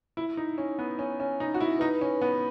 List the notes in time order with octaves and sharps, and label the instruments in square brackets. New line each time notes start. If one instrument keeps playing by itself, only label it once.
[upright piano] E4
D#4
C#4
B3
C#4
C#4
D#4
F#4
E4
[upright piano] D#4 [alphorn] B4
[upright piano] C#4
B3